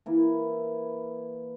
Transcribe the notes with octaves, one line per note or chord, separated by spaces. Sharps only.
E3 A#3 E4